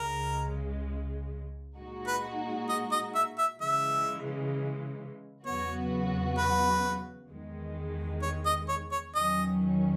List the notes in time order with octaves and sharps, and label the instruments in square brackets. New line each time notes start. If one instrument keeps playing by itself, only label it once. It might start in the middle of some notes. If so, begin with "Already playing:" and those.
Already playing: [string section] C#2 C#3 G#3 [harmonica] A#4
[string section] A#2 G#3 D#4 F#4
[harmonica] B4
D#5
D#5
E5
E5
[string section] C#3 E3 G#3 [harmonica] E5
[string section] E2 C#3 F#3 B3 F#4 [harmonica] C#5
[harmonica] B4
[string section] E2 D#3 G#3
[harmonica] C#5
D#5
C#5
C#5
[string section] E2 D#3 F#3 C#4 [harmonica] D#5